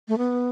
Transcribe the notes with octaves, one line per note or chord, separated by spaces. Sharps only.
A3
B3